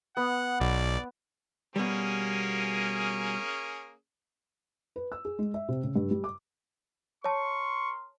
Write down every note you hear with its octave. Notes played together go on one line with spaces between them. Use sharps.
B3 F#5
B1 D5
B2 G3 A#3 C#4 G#4
B4
E6
G#4
G#3
E5
C3
C#3
G2
G3
D6
A#4 C#5 A5 C6 C#6